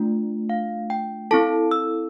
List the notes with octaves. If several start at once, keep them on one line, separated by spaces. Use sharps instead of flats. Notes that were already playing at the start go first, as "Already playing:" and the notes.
Already playing: A3 D4 F4
F5
G5
C4 E4 A4 A5
E6